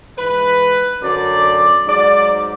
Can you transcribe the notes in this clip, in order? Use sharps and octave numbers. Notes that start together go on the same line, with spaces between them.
G#2 E3 B4
F#2 D3 F#3 D5
G#2 F#3 D5